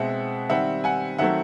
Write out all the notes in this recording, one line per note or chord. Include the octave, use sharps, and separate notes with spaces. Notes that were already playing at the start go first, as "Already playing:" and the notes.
Already playing: B2 G#3 C4 E5 F#5
D#3 G3 C4 E5 F#5
F#5 G#5
D#3 F#3 A3 C4 E5 F#5